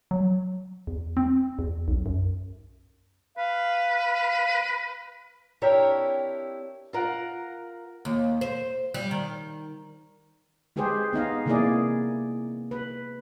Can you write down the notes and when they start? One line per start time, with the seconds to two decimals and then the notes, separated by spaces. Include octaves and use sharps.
0.11 F#3
0.87 E2
1.17 C4
1.59 E2
1.88 B1
2.06 F#2
3.38 B4 F5
5.62 C4 D4 E4 G4 A#4 C#5
6.93 F4 A#4 F#5
8.05 D#2
8.41 C5
8.94 G3
9.11 D#3
10.76 G#3 G4 G#4 B4 C5
11.13 B3 D#4 D#5 F5
11.46 C3 E3 A#3 E4 G#4 D5
12.71 B4